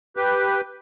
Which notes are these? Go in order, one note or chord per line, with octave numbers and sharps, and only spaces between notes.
G4 B4